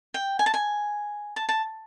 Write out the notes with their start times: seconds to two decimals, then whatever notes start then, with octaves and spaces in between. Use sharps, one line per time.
0.14 G5
0.39 G#5
0.46 A5
0.54 G#5
1.36 A5
1.49 A5